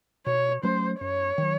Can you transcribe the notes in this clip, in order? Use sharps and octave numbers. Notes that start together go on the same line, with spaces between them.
B2 C#5
F#3 A3 C#4 C5
F#2 C#5
D#3 F#3